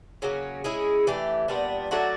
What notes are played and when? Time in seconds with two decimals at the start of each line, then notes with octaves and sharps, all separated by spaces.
0.22 C#3 F#3 A#3 C#4
0.64 G#3 C#4 E4 G#4
1.07 E3 A3 D4 G4
1.48 A#2 G3 B3 D4
1.91 F#3 A3 D4 F#4